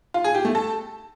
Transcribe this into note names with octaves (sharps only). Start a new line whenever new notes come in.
F4
G#4
G4
A3
A4